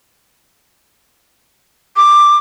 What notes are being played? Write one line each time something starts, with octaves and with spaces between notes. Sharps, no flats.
D6